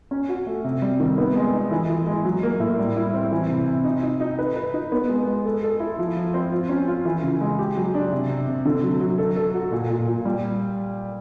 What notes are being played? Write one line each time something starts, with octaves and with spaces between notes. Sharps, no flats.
C#4
F#4
A3
C3
G3
D#3
B3
G#3
D#4
E3
E3
G#3
F#3
A#3
A2
G3
E4
C4
E3
C3
C3
D#4
D#4
D#4
B4
B4
D#4
B3
G#3
G#3
A4
A4
E4
F3
F3
C4
F4
C#4
F4
E3
C#3
G#3
G4
F#3
D4
C3
C3
C3
D3
F#3
F#3
A4
A4
F#4
A#2
A#2
A#2
G3